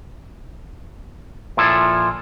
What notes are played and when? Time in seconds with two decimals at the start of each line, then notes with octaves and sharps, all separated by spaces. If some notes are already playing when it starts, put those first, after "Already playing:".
1.57 A#2 F3 E4 A4